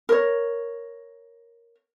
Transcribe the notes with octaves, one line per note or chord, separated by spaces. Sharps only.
A#4 C#5